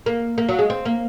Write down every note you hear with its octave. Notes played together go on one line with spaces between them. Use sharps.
A#3
A#3
F#3
G#3
C4
A#3